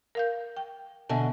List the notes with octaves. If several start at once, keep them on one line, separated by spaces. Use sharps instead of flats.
A#4 F5 G6
G5
B2 D3 E5 G#5 A5